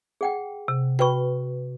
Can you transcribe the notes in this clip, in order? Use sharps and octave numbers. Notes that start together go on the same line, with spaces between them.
G#4 F#5 G5
C3
F#4 B4 G5 B5 C#6